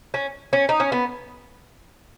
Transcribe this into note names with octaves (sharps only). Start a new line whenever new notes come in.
C#4
C#4
D#4
C#4
B3